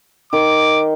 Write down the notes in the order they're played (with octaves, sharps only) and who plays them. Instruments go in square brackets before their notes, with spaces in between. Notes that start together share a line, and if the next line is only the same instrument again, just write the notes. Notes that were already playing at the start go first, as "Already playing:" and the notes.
[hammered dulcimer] D#3 C6 [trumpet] D6